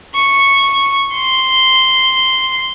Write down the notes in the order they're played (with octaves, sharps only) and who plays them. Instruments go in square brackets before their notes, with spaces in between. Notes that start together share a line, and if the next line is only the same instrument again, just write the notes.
[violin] C#6
C6